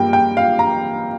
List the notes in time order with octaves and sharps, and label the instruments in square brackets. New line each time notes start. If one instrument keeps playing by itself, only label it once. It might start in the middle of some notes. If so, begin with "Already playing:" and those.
Already playing: [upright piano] G2 G3 A#3 G5
G5
F5
A#5